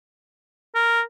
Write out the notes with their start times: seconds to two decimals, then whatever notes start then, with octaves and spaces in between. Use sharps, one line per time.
0.75 A#4